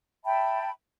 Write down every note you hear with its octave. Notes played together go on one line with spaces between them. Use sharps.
E5 G5 A5 B5